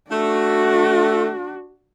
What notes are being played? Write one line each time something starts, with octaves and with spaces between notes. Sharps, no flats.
A3 D4 F#4